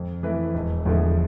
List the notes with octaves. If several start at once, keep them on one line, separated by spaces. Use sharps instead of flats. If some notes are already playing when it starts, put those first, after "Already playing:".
Already playing: F2
E3 A3 E4 B4
E1
E2 D3 F3 A3